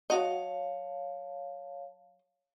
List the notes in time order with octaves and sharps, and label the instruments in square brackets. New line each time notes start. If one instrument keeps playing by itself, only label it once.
[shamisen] F#3 F#4 D#5 [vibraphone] C#5 F5 A5